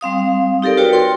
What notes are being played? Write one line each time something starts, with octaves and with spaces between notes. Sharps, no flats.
G3 C4 F5 D#6
D#4 G4 A4 A#4 D5
F4 F#4 A#4 B4 C#5 G5
C#5 G5 C6